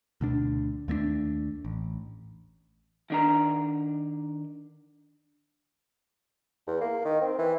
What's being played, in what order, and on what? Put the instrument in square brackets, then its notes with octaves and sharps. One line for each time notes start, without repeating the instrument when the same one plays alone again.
[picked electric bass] D2 B2 D4
D#2 A3 B3 D4
A1
[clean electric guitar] D#3 D4 A#5
[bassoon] E2
A#3
D#3
C4
E3